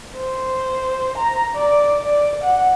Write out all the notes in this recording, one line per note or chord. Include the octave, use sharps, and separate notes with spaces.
C5
A#5
D5
D5
F#5